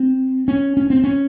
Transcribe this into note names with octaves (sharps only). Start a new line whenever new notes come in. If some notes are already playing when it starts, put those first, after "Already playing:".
Already playing: C4
C#4
C#4
C4
C#4